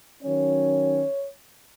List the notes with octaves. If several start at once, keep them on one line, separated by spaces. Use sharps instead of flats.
D#3 F#3 C#4 C#5